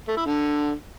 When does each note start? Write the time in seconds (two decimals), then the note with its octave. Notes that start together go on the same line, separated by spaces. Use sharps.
0.08 A3
0.17 E4
0.26 D3